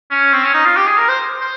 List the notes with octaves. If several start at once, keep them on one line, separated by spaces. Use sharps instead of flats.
C#4
C4
C#4
D#4
F4
G4
G#4
A#4
C5
C5